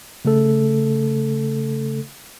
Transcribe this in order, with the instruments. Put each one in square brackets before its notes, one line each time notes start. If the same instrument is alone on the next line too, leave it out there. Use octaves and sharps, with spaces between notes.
[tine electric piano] C#3 A3 A4